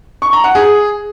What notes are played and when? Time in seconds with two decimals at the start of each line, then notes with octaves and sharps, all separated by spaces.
0.22 C#6
0.33 A#5
0.44 F#5
0.55 G#4